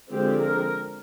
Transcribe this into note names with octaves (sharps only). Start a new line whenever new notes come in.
D3 F3 G#3 C4 G4
A#4